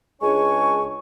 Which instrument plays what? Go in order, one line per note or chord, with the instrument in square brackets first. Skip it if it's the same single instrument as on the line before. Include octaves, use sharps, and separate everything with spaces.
[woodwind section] C#2 G#3 D4 C#5 G#5 C#6